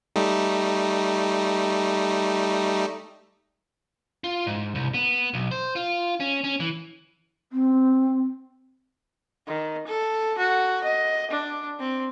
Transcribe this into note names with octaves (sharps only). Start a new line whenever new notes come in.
G3 A3 D#4
F4
G#2
C2
B3
B1
C5
F4
C#4
C#4
E3
C4
D#3
A4
F#4
D#5
D4
C4